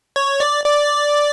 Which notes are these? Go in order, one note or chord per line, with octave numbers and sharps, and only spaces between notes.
C#5
D5
D5